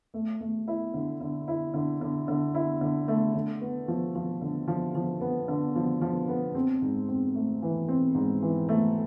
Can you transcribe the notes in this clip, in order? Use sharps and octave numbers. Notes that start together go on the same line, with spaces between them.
A3
A3
E4
D3
D3
E4
D3
D3
D3
E4
D3
A3
D3
B3
F3
F3
D3
F3
F3
B3
D3
F3
F3
B3
C4
G#2
C4
A3
E3
C4
G#2
E3
A3